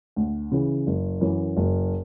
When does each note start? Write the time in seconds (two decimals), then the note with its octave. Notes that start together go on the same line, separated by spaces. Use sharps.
0.16 D2
0.51 C#3 E3
0.87 F#1
1.21 F#2 E3
1.57 F#1